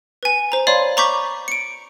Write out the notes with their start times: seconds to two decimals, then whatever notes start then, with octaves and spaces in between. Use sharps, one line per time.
0.23 B4 G#5
0.52 C5 A#5
0.67 C#5 D5 F5 B5 C6
0.97 A#5 B5 C#6 D6 G6 B6
1.48 C#7 D7